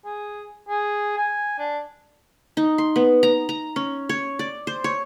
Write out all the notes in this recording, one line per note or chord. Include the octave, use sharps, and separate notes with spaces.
G#4
G#4
G#5
D4
D#4
C6
B3
A#5
A#5
C#4
C#5
D5
C5
C#5